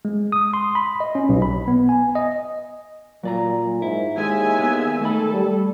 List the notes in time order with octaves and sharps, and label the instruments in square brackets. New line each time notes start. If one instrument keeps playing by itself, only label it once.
[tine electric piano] G#3
D#6
C6
B5
D#5
C#4
B1
B5
B3
G#5
D#5
[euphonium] A#2 [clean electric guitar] F#3 D5 A#5
[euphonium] G#2 [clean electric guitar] E4
[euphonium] D#2 [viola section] G#3 E5 G#5
[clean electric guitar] B3
[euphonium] D#3 [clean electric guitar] A3 B5 [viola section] A4
[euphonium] G3